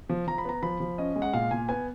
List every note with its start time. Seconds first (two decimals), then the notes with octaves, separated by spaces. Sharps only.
0.09 F3
0.27 F3 A#5
0.38 B5
0.45 B3 A#5
0.63 F3 B5
0.80 F3
0.98 C#4 D#5
1.16 G#3
1.22 F#5
1.34 A#2 F5
1.51 A#2 G#5
1.69 B3 G#5